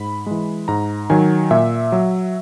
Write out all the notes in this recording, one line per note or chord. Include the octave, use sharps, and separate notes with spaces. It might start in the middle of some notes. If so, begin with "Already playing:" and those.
Already playing: G#2 B5
E3 G#3
G#2 A#5
D#3 F#3 G#5
A#2 E5
F#3